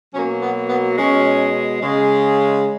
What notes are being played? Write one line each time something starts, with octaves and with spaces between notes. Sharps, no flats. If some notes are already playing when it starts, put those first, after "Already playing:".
B2 F#3 A#3 C#4
B3
B3
B2 G#3 C#4
C#3 G#3